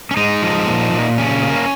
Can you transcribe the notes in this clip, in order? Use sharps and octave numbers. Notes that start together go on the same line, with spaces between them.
C#4
G#3 D#4
F3
A#2
A#2
C#3 C#4
A#3